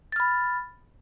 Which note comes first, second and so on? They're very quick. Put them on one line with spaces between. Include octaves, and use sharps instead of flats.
A6 F6 B5